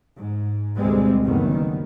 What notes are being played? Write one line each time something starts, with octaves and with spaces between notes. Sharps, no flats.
G#2
D2 B2 G3 G#3 C4
F#1 D#3 G3 B3